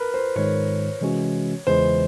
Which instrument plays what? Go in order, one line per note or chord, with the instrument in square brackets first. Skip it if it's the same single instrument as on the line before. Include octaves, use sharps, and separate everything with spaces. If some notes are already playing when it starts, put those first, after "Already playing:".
Already playing: [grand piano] A#4 B4
C5
[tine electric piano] G#2 D#3 G#3 [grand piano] C#5
[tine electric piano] C3 E3 G#3 C#4 F#4
[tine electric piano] E2 C#3 E3 G#3 [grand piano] C5